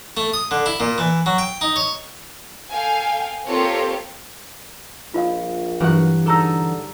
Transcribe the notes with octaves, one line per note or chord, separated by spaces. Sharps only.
A3
D#6
D3
E4
A#2
E3
F#3
G5
D#4
C#5
A4 F5 G5 G#5
A#3 C4 F4 G4 A4 C#5
A#1 F4 D#5 F5
G2 E3 F#3 F#5
D3 D#4 G#4 A4 A#5 E6